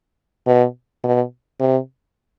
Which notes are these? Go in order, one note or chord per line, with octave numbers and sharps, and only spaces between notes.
B2
B2
C3